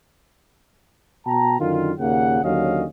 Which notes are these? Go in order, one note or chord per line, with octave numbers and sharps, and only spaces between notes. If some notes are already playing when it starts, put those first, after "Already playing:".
B2 G5 A5 A#5
F#2 D3 D#3 F4
D#2 A#2 C#3 A#3 F#5
D#2 D3 F#3 C#4 D#5 F5